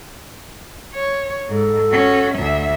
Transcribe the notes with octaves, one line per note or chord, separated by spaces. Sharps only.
C#5
G#2 A4
C#4 F#4
D2 E5